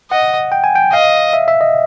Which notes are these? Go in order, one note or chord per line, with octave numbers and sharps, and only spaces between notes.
D#5 F#5
G5
G#5
G5
D#5 F5
E5
E5
D#5